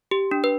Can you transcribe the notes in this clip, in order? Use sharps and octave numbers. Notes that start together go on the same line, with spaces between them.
G4
D4
B4